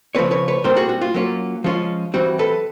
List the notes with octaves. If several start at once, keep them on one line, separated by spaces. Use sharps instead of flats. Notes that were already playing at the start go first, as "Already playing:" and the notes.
C#3 F3 A3 C4 B4 C#5
B4 C#5
B4 C#5
A#2 G3 C4 A#4 C5
F#4 G#4
F#4
F4
F#3 A#3 C#4 F4
F3 G#3 C#4 F4
E3 G3 C4 F#4
A4 B4